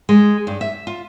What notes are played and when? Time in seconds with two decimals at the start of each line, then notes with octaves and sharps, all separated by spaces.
0.09 G#3
0.47 G2
0.61 E5
0.87 F4